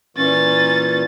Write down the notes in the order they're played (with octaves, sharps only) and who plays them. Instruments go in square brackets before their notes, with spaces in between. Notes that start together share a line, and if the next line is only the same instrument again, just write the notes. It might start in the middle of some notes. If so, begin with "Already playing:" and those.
[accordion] A#2 E3 [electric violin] C#4 A6